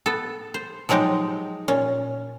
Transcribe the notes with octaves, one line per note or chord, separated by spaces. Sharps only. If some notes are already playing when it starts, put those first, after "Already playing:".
B3 A4
C5
F3 F#3 G#3 D#4 G4
A#2 C#4